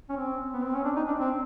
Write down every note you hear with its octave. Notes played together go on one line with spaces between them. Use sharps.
C#4
C4
B3
C4
C#4
D4
D#4
D4
C4